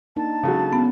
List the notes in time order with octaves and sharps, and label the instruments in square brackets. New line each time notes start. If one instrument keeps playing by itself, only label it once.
[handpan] A#3 D4 D#4 [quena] A5
[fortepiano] C#3 F#3 [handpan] G#3 A4
[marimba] B3 [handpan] C#4